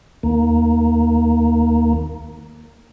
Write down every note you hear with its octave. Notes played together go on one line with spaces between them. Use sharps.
D#2 A#3